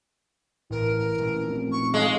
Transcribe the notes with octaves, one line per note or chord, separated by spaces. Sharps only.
A1 A2 E3 A#4
A#2 A3 C#4
F1
C#6
G#3 F5